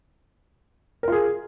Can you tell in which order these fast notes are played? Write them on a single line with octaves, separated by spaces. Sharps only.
A#4 F4 G#4